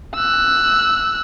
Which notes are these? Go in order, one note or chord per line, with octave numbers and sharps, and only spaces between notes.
E6 F#6